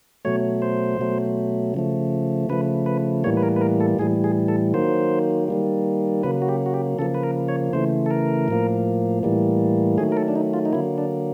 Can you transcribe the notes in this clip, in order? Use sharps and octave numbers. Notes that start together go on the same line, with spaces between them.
B2 F#3 A3 C#5
C5
B2 F#3 A3
C#3 F3 A3
C#3 F3 A3 B4
B4
A2 E3 G3 A#3 C#5
B4
A#4
B4
A#4
A4
A2 E3 G3 G#4
G#4
A4
D#3 F#3 A#3 C5
D#3 G3 A#3
C#3 F#3 A#3 B4
F#4
G4
F#4
G4
C#3 F3 A#3 A4
B4
A#4
C#5
C#3 E3 A3 C5
A4
A#4
A2 F3 A#3
A2 E3 G3 A#3
D#3 F#3 A3 G#4
A#4
A4
D4
D#4
F4
D#4
D3 F#3 A#3 E4
D4